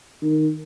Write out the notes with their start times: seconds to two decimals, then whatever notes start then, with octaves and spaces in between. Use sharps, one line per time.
0.22 D#3